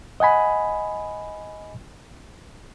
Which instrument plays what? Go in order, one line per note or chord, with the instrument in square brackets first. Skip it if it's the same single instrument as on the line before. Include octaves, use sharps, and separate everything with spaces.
[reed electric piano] D#5 F#5 G#5 B5